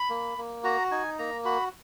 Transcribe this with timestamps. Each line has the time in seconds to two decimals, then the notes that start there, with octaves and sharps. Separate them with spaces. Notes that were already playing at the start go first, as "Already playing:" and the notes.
Already playing: B5
0.10 A#3
0.38 A#3
0.64 F#4 A#5
0.91 D#4 G#5
1.18 A#3 A#5
1.45 F#4 B5